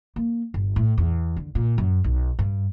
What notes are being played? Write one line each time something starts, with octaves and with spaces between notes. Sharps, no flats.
A#3
G1
A2
E2
D3
A#2
F#2
B1
G2